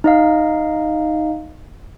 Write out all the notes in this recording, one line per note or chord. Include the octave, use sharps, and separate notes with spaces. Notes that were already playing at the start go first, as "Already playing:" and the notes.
D#4 D#5 F5